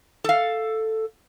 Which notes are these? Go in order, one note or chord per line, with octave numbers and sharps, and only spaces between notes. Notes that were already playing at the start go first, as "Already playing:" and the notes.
A4 F5